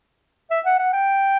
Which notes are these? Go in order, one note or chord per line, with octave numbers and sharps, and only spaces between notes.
E5
F#5
F#5
G5